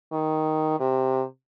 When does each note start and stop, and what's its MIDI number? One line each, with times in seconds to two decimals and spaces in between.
0.12 0.76 51
0.79 1.23 48